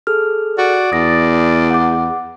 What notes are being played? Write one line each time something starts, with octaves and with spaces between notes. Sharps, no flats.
G#4 A4 F6
F#4 D5
E2 D#6 A6 A#6
F#5 D6